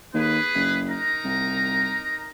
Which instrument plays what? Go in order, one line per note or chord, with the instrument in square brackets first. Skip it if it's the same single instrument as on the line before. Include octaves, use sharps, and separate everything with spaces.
[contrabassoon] D#2 [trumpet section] G#4 B4
[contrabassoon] F#1
[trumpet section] D#4 A#4 A#5
[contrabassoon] C2